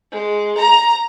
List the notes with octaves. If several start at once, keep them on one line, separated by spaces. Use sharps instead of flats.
G#3
A#5